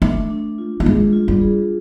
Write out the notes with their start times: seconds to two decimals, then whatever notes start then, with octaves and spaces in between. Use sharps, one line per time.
0.02 A3 D4
0.30 D4
0.58 F4
0.80 A3
0.85 G#3 G#4
1.13 F4
1.28 G3
1.41 G#4